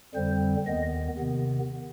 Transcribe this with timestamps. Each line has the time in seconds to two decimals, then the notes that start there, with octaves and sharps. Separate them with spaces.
0.15 F2 D3 G3 C4 C5
0.66 D#2 D#3 B3 D#5
1.19 C3 D#3 B3